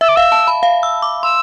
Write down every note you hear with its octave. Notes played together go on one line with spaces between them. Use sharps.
E5 E6
D6
F5 E6
A5
B5
F5
E6
D6
C6 E6